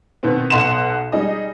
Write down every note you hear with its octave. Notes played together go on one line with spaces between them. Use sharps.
B2 D#3 B3 C4
B1 B2 D#5 F#5 C6 E7
G3 D#4 G#4 D#5